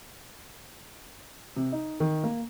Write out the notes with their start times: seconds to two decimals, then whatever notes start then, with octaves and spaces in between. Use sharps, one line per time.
1.56 C3
1.72 D#4
2.00 D#3
2.24 A#3